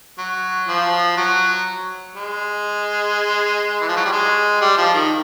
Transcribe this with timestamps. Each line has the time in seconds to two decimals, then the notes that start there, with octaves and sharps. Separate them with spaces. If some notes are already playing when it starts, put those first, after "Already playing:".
0.18 F#3
0.68 F3
1.17 F#3
2.15 G#3
3.81 E3
3.89 F3
3.97 F#3
4.05 G3
4.12 G#3
4.61 G3
4.77 F3
4.94 D#3